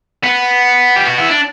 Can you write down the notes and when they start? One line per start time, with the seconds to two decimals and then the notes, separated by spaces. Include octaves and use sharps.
0.24 B3
0.96 G4
1.07 F#4
1.19 E4
1.30 D4